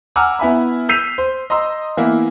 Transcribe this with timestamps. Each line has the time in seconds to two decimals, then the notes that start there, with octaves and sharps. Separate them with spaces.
0.16 F#5 G#5 A#5 D6 E6 F6
0.39 B3 E4 E5 G#5 B5
0.89 E6 G6 B6 C7 D#7 F7
1.18 C5
1.50 D#5 A#5 C6 E6
1.97 E3 A#3 B3 E4